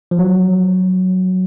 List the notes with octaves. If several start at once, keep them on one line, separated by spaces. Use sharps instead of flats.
F3
F#3